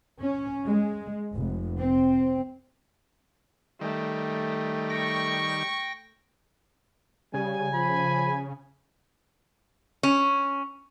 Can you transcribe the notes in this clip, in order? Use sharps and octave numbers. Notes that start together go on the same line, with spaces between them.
C#4
G#3
F1
C4
D#3 G3 A3
G5 C#6 A#6
C#3 G3 G#5
F3 B5
C#4